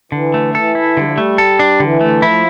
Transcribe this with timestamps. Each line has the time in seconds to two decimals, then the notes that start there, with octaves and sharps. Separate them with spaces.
0.12 D3 E3
0.34 A3
0.55 E3 A4
0.75 E4
0.97 D3 G3
1.04 F3
1.11 G3
1.18 A3
1.38 A4
1.59 D4
1.80 D3 E3
2.01 A3
2.22 F3 E4